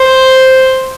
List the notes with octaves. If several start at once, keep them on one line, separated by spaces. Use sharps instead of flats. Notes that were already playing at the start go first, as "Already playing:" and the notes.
Already playing: C5